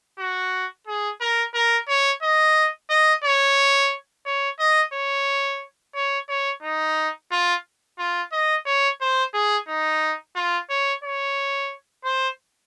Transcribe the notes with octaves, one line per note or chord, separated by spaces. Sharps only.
F#4
G#4
A#4
A#4
C#5
D#5
D#5
C#5
C#5
D#5
C#5
C#5
C#5
D#4
F4
F4
D#5
C#5
C5
G#4
D#4
F4
C#5
C#5
C5